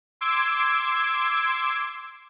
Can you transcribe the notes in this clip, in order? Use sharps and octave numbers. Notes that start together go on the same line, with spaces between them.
C6 D6 E6 G#6 D7